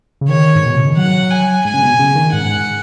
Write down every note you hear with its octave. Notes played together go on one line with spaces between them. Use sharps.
C#3
D#3 C#5
G#2
B2
C#3
D#3
F#3 F#5
G#5
G#2 G#5
C#3
B2
C#3
D#3
G#2 F#5